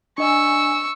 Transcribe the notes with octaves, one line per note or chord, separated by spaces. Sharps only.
D4 D#5 G#5 C#6 E6